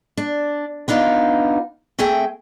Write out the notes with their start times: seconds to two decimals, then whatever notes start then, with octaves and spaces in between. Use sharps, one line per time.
0.17 D4
0.88 B3 D4 D#4 F4
1.99 A3 C4 G#4 E5 G5